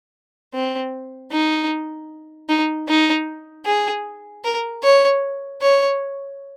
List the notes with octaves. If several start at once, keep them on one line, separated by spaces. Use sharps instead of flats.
C4
D#4
D#4
D#4
G#4
A#4
C#5
C#5